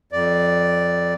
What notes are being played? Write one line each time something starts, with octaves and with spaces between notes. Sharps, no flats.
F2 D5